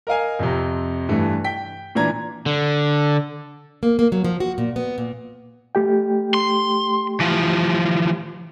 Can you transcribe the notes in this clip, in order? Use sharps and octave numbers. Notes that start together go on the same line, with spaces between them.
A#4 D#5 F5 G#5
F2 C3
G2 E3 A3
G5 B6
A#2 E3 D4 A#5 G#6
D3
A#3
A#3
F#3
F3
F#4
A#2
B3
A#2
A3 G4 G5
C6
E3 F3